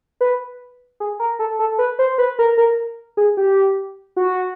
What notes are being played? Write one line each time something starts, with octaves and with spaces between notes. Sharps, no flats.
B4
G#4
A#4
A4
A4
B4
C5
B4
A#4
A#4
G#4
G4
F#4